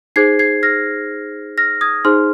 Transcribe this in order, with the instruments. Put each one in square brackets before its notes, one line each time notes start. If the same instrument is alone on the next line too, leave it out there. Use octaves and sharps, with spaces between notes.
[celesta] D#4 G#4 C5 G#6 C7
G#6 C7
F6 A#6
F6 A#6
D#6 G#6
D#4 G#4 C5 C6 F6